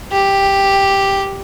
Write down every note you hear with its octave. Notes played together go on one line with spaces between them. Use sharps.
G4